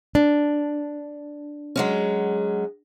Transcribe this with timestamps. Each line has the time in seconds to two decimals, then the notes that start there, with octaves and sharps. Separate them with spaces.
0.15 D4
1.76 F#3 G#3 C#4